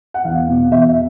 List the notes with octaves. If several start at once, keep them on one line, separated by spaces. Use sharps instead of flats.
F#5
E2 F5
B2
E2 E5